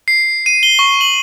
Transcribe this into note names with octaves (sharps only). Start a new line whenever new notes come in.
C7
D#7
G7
C#6
F#7